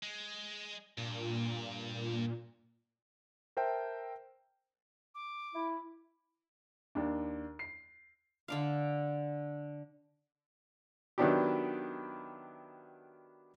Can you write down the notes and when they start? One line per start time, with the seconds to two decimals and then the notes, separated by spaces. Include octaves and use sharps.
0.03 G#3
0.98 G2 A#2
3.57 A#4 C5 E5 G5 A5
5.15 D6
5.55 E4
6.95 D#2 D4
7.59 C7
8.48 D3 D4 F5
11.18 D#3 F#3 B3 D4 E4 G4